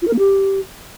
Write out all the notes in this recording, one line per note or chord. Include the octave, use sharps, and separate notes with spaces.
F4
A#4
A#3
G4